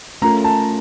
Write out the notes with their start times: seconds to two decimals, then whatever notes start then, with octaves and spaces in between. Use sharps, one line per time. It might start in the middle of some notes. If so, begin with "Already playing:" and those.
0.22 A3 C#4 F4 A#4 A#5
0.44 A5